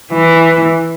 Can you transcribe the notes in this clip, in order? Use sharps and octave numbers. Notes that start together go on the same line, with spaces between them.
E3